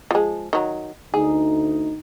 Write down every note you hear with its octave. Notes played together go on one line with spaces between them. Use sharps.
F3 G#3
D#3 F#3
D2 D#4 G#4